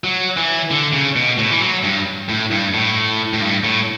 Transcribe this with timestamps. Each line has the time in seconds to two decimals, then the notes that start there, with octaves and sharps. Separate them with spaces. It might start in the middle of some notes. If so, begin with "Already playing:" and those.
0.04 F#3
0.37 E3
0.71 D3
0.93 C#3
1.16 B2
1.38 A2
1.51 E3
1.60 F#3
1.83 G2
2.29 A2
2.51 G2
2.74 A2
3.33 A2
3.40 G2
3.64 A2